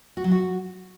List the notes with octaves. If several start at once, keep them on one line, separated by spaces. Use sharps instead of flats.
F#4
F#3
F#4